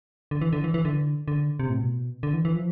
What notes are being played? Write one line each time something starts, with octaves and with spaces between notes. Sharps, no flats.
D3
E3
D3
E3
E3
D3
D3
C3
A2
B2
D3
E3
E3
F3